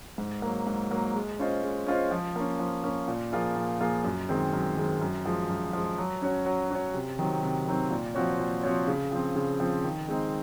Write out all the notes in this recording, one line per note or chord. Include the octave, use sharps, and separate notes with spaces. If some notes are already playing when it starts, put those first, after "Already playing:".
G#2
F#3 A#3
G#2
F#3 A#3
G#3
C#4 F4 C5 D#5
G#3
C#4 F4 C5 D#5
F3
A#3 C#4
F3
A#3 C#4
A#2
F3 A#3 F4 G#4
A#2
F3 A#3 F4 G#4
F#2
D#3 G#3 C4
F#2
D#3 G#3 C4
F#2
F3 G#3
F#2
F3 G#3
F#3
C#4 F#4 C#5
F#3
C#4 F#4 C#5
C3
D#3 F#3 C4
C3
D#3 F#3 C4
A#2
F3 C4 F#4 C#5
A#2
F3 C4 F#4 C#5
C#3
F3 C4
C#3
F3 C4
D#3
G#3 C4 D#4